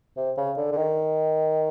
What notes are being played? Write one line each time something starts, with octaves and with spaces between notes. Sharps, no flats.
C3
C#3
D3
D3
D#3